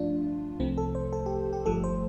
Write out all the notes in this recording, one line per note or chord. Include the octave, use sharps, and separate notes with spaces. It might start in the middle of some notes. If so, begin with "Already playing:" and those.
Already playing: G2 F3 A3 D4 F4
C2 C3 F3 A3 C4
A4
C5
A4
G4
G4
G1 G2 F3 A3 A4
C5